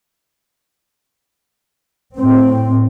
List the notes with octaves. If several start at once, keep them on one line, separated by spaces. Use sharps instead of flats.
A2 C4